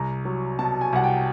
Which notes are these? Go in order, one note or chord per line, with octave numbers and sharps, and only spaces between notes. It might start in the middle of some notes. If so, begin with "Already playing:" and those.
Already playing: C2 A#5
F#3
B2 A5
G#5
C2 F#5
G5